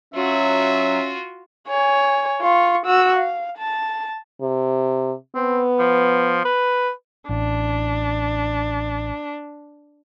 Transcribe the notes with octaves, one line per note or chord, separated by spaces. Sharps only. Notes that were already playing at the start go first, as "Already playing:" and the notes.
F#3 C#4 F4 F#4 E5
C#5 G#5
F4 C#6
F#4 E6
F5
A5
C3
B3 C4
F3
B4
A1 D4